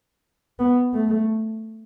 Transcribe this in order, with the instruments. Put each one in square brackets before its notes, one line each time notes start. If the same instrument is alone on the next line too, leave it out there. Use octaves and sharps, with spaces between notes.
[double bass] B3
A3